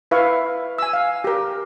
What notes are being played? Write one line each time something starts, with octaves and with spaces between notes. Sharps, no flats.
E4 B4 E5 F5 C#6
G#5 E6
F5
G4 A#4